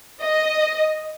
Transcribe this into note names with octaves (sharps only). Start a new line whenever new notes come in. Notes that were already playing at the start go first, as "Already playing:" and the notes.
D#5